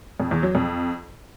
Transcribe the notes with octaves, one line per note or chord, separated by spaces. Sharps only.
F2
E2
F#3
F2